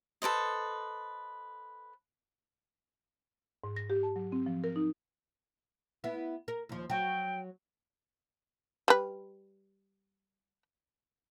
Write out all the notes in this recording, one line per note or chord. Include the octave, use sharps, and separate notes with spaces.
A4 B4 C5 D#5
G#2
A#6
G4
A5
F#3
C4
F3
A#4
D#4
B3 E4
A#4
D#2 F3
F#3 F#4 G5
G3 B4